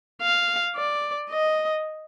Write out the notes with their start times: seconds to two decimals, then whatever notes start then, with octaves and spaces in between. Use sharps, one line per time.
0.21 F5
0.76 D5
1.30 D#5